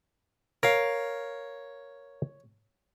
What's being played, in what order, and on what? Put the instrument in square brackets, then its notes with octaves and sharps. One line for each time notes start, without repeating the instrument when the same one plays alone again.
[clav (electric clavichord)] A#4 F5 [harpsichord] C#5